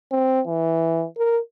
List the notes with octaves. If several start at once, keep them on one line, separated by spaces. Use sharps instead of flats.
C4
E3
A#4